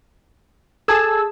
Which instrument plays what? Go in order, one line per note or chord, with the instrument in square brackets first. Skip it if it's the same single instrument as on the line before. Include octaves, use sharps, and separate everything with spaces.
[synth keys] G#4 A5 E6 [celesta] A4 G#6